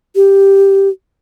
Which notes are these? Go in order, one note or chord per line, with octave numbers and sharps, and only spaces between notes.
G4